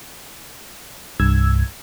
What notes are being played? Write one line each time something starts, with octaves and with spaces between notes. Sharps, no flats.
C2 G2 E6 G#6